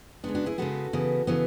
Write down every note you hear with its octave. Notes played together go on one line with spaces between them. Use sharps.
C#3 G#3 B3 D4
D4 F#4
E4 G#4
C#3 G#3 B3 F#4 A4
C#3 E3 B3
C#3 E3 B3